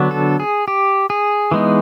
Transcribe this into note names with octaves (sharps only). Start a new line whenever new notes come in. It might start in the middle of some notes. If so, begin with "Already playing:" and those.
Already playing: D3 F#3 B3 D4
A4
G#4
G4
G#4
E3 G#3 B3 D#4